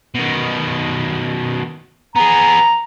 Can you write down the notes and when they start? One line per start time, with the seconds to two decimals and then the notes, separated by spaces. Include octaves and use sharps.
0.15 B2 D#3
2.16 B3 G#4 A#5